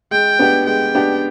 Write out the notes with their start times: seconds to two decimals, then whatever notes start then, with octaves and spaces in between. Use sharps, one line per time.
0.11 G#3 G5
0.39 B3 D4 G4
0.67 G#3 G5
0.95 B3 D4 G4